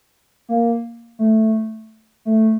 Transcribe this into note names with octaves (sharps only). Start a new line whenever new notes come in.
A#3
A3
A3